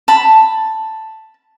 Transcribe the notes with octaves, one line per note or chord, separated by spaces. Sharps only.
A5 B5